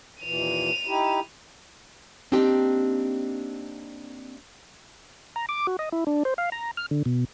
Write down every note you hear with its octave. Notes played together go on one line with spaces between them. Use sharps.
D#2 A#2 E3 D#7 F7
D#4 E4 G4
A#3 C4 D4 D#4 G4 G5
A#5
D6
F#4
D#5
E4
D4
C5
F5
A#5
F6
D3
B2